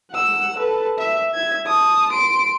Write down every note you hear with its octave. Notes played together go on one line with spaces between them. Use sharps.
F#5 E6
A4 B4
E5
E5 G#6
A5 D#6
C6 D7